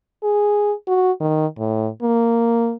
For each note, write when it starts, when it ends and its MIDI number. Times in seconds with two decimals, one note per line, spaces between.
0.23 0.73 68
0.87 1.11 66
1.20 1.46 51
1.59 1.89 45
2.02 2.75 58